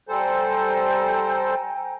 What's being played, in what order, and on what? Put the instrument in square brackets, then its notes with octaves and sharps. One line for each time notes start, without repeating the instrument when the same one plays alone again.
[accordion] G3 A4 C5 [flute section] G5 G#5 A#5